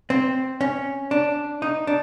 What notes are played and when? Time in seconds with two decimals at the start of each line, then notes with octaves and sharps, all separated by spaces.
0.10 C4
0.61 C#4
1.11 D4
1.62 D#4
1.87 D4